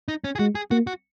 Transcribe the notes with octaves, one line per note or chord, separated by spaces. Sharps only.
D#4
C#4
G#4
G#3 F#4
G#4
A#3 F#4
F#4